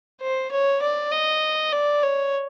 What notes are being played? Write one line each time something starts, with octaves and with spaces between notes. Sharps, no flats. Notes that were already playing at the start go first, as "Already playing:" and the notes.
C5
C#5
D5
D#5
D5
C#5